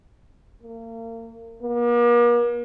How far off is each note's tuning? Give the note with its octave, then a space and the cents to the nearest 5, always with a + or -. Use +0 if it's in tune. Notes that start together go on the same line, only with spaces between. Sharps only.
A#3 -35
A#3 +45